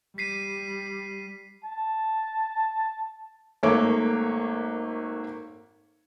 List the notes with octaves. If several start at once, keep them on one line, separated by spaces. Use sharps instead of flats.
G3 B6 C7 D#7
A5
G#1 A3 A#3 C#5 D6